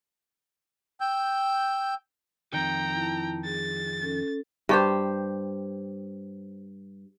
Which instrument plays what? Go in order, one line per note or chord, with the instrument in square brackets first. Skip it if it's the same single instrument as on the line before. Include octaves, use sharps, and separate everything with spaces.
[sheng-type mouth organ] G5 E6 G6
[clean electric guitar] F2 D#3 [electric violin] G5 A#5
[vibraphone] E4 A5
[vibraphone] G#4 [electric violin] A6
[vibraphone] C#4 A4
[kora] G2 G4 C5